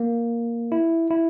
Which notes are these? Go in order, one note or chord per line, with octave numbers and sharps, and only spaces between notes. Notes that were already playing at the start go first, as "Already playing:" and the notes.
Already playing: A#3
E4
E4